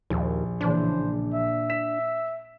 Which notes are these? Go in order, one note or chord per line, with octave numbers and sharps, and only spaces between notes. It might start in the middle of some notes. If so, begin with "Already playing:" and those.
A#1 D#2
A#2 C#3 E3 D4 C5
A#2
E5
B6 E7